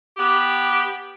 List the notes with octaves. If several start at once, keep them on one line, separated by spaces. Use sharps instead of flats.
B3 G4